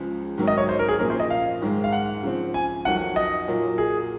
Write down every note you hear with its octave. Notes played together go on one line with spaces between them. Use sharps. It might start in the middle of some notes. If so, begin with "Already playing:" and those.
Already playing: C#2 C#3 F3 G#3
G#2 D#3 F#3 C4
D#5
C#5
C5
A#4
G#4
A#2 F3 A#3 C#4 A#4
C5
D#5
F5
G#2 D#3 G#3
F5
F#5
C#3 F3 C4
G#5
F2 D#3 F#3 F#5
D#5
A#2 F#3 A#3 F4
G#4